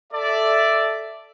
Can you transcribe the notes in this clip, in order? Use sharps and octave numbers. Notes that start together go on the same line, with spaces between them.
A4 D5 E5